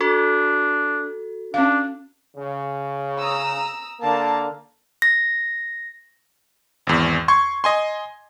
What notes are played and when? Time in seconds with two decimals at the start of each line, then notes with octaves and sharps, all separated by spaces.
0.01 D4 F#4 A4
1.54 C#4 D4 F5
2.36 C#3
3.20 A#5 D#6 E6
4.01 D3 A#3 A5 A#5
5.02 A#6
6.87 G#1 E2
7.28 C6 C#6 G#6
7.64 D#5 G#5 C6